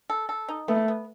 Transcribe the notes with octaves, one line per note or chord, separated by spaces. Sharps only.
A4
A4
D#4
A3 B3
B3